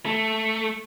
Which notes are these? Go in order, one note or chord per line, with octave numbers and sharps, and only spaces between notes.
A3